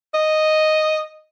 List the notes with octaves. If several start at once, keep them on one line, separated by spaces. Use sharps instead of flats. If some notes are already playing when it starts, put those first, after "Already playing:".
D#5